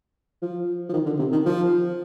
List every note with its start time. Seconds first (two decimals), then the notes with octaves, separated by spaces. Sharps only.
0.42 F3
0.89 F3
0.93 D#3
1.06 D3
1.19 C3
1.32 D#3
1.46 F3